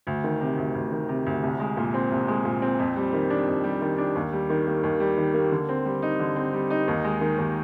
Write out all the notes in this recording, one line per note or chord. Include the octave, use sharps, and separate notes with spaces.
D2
D#3
C3
D2
D2
D#3
C3
D2
C2
G#3
A#2
C4
C2
G#3
A#2
C4
F2
G3
D#3
D4
F2
G3
D#3
D4
D#2
G3
D#3
A#3
D#2
G3
D#3
A#3
D3
C4
G3
D#4
D3
C4
G3
D#4
D#2
G#3
D#3
D#2